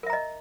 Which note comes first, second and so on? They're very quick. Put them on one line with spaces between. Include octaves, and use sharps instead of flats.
A#4 E5 A#5 D#5